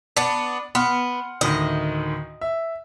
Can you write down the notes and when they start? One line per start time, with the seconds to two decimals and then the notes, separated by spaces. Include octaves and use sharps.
0.16 B3 D4 D5
0.75 B3 F#5 C6 F6
1.41 D2 A2 D#3 D#5
2.41 E5